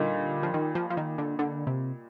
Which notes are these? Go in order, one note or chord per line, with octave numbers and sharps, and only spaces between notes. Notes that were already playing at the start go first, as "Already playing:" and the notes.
Already playing: A#2 D3 G3 A#3 D#4
F3
D#3
F3
F3
D#3
D3
D3
C3